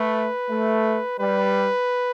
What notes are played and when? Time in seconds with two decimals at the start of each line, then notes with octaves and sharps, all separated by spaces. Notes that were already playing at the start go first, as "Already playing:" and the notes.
Already playing: A3 B4
0.50 A3
1.19 G3 B4